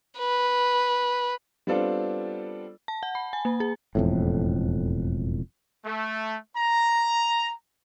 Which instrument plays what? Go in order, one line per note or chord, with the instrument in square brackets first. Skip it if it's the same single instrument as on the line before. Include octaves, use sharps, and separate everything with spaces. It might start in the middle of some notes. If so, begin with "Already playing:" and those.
[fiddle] B4
[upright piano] G3 B3 C4 D4 F4 A4
[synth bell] A5
F#5
B5
G#5
A#3
G#4
[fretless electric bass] E1 F2 A2
[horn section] A3
A#5